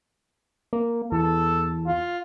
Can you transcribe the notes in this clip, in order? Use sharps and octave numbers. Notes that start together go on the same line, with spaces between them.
A#3
E2 A4
F4